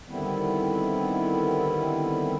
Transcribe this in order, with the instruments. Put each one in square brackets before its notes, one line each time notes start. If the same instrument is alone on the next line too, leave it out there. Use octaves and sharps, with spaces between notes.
[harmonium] D3 D#3 G3 B3 C4 E4